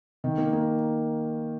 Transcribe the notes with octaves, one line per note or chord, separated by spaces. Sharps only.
D#3
A#3
A#3